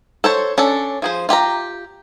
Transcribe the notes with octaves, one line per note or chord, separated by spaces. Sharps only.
A4 C5 C#5
C#4 D4 A4
F3 G#4 C5
F4 G4 G#5 A#5